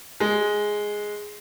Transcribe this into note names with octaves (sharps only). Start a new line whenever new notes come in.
G#3